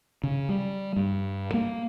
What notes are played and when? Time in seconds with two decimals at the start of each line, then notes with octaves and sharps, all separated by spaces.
0.24 C#3
0.49 G3
0.96 G2
1.54 A#3